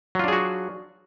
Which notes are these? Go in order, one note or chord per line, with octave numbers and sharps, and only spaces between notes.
F#3 D4 F4 F#4 G#4